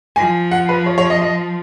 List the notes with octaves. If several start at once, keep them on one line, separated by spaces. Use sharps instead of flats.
F3 G#5
F#5
B4
C#5
C#5
D#5
D#5